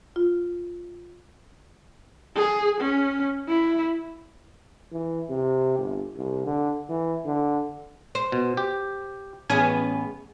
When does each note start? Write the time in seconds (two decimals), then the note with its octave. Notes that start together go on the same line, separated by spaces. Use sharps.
0.16 F4
2.36 G#4
2.80 C#4
3.48 E4
4.92 E3
5.29 C3
5.78 G1
6.16 C2
6.46 D3
6.89 E3
7.25 D3
8.15 C5
8.32 B2
8.57 G4
9.50 A1 B3 C#4 G#4 G#5